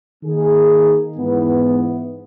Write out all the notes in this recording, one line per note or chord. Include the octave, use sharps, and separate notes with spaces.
D#3 A#3 D#4 G#4
G#2 E3 B3